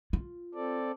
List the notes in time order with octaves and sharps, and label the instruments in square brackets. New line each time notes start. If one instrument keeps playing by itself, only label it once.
[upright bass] F4
[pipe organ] C4 A4 D5